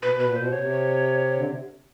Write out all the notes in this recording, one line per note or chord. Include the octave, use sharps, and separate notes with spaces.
B2 B4
B2
B4
A#2
B2 C5
C3
C#5
C3
D3
C3